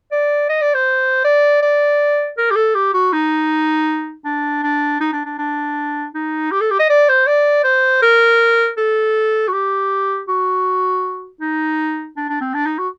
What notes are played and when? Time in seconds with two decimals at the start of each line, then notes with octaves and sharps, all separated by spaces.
0.11 D5
0.49 D#5
0.61 D5
0.74 C5
1.24 D5
1.62 D5
2.38 A#4
2.51 G4
2.56 A4
2.75 G4
2.93 F#4
3.13 D#4
4.25 D4
4.63 D4
5.00 D#4
5.13 D4
5.25 D4
5.38 D4
6.14 D#4
6.51 G4
6.61 A4
6.71 G4
6.79 D#5
6.90 D5
7.09 C5
7.27 D5
7.64 C5
8.02 A#4
8.77 A4
9.48 F#4
9.53 G4
10.28 F#4
11.41 D#4
12.17 D4
12.29 D4
12.41 C4
12.54 D4
12.66 D#4
12.78 F#4